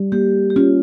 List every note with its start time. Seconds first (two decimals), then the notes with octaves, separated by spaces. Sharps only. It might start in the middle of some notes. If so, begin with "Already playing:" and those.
Already playing: G3
0.12 A#3 G4
0.50 G4
0.56 C#4 F4